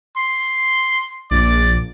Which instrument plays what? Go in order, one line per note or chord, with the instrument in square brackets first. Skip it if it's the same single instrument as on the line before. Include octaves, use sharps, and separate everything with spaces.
[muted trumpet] C6
[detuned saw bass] A#1 [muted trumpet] D5